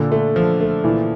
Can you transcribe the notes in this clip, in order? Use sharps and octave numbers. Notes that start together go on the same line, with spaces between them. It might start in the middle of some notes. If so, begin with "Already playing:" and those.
Already playing: A#2 D3
A3
F3
A3
A#2 E3